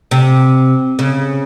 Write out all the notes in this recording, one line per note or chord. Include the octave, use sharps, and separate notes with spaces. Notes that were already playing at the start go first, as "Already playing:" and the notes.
C3
C#3